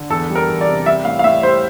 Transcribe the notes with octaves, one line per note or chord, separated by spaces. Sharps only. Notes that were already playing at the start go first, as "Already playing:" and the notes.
Already playing: D3
E2 A4
G3
A#4
E2
D5
C3
G3 E5
A2 F5
F5
A2 E5
G3 C5